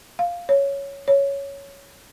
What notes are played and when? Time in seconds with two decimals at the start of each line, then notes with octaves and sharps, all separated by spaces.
0.19 F5
0.49 C#5
1.08 C#5